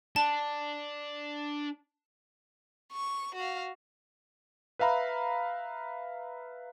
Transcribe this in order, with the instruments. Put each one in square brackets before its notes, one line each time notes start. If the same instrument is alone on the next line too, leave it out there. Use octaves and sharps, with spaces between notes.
[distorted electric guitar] D4 [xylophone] A5
[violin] C#6
F#4 F5
[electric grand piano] B4 E5 F5 A#5 B5